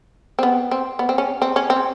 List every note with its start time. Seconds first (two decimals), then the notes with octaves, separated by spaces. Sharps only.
0.39 C4
0.43 B3
0.71 C4
0.99 B3
1.09 C4
1.18 C#4
1.42 C4
1.56 C#4
1.70 C4